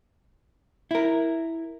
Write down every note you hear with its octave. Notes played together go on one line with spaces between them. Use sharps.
E4 A#4